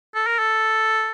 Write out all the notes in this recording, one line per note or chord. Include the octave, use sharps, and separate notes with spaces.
A4
A#4
A4